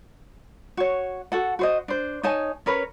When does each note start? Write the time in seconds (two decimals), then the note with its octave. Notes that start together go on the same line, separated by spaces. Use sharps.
0.77 F#4 C#5
1.32 F#4 A4 F#5
1.59 F#4 C5 D#5
1.88 D4 C5
2.23 D#4 C#5 G#5 A5
2.66 C#4 A#4 B4 C#5